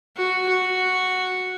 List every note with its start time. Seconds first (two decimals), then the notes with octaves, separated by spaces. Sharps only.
0.16 F#4
0.49 F#4